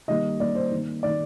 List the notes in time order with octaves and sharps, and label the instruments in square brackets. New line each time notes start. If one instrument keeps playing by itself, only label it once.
[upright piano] D#3 G3 A#3 D#5
D#3 G3 A#3 D5
C5
D#3 A#3
D#3 A#3 D5